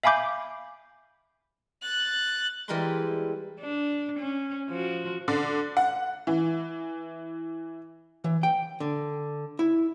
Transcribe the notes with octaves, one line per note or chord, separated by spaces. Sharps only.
E5 F5 G#5 B5 D6 G6
F#6 A6
E3 G3 G#3 A#4 B4 C6
D4
C#4
F3 F#4
D3
F#5
E3
E3
G5
D3
E4